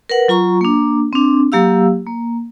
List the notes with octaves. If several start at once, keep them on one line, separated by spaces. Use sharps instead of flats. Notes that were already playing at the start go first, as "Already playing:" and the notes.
A#4 B4 F#5
F#3 F4 A#5 C#6
A#3 D4
C4 D4
F#3 A#3 G4 F5 E6
A#3